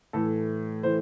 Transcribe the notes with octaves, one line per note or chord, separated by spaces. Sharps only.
A2 E3 A4
A2 E3 C5